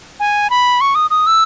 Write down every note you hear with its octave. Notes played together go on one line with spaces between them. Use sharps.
G#5
B5
C#6
D#6
D#6
E6